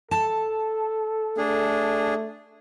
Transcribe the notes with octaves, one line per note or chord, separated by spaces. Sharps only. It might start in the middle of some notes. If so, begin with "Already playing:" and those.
A4 A5
A3 D4 G#4